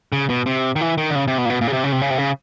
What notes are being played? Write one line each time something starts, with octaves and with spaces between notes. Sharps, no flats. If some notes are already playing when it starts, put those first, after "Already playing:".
C#3
B2
C3
D#3
E3
D#3
D3
C#3
C3
B2
A#2
B2
A#2
C#3
C3
C#3
C3
C#3
C3
C#3